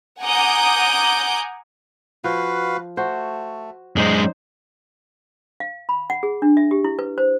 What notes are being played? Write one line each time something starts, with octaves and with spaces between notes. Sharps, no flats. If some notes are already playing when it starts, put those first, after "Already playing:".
F#5 G#5 A#5 D6 D#6 G6
F3 F#4 B4 F5
A3 F#4 C5
F#2 G#3 D4 D#4 C5 D#6
F5
B5
F#5
G#4
D4
E5
G4
E4
B4
C5